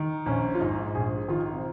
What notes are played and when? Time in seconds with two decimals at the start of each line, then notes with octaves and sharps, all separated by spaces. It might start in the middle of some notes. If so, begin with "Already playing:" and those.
Already playing: D#3
0.26 A#1 C#4
0.55 F4
0.60 G#2 D#4
0.95 A#1 G#4
1.28 D#3 F4
1.53 C4